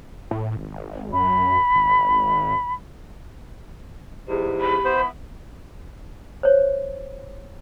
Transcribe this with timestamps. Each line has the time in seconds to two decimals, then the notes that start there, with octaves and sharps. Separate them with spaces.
0.31 A2
0.57 G#1
1.13 F#2 B5
1.76 G#1
4.28 E2 G#2 G4
4.61 B5
4.85 B3 E4 C5
6.43 C5 C#5